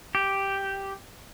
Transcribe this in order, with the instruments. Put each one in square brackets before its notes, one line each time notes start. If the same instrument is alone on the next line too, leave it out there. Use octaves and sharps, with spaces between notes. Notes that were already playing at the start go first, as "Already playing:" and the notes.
[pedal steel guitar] G4